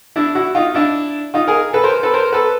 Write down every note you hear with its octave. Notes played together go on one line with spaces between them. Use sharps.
D4 E4
E4 F#4
D#4 F4
D4 E4
D#4 F4
G#4 A#4
A4 B4
A#4 C5
A4 B4
A#4 C5
A4 B4